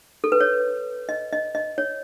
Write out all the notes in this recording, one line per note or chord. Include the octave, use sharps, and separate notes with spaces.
A4
B4
C#5
D#5
D#5
D#5
C#5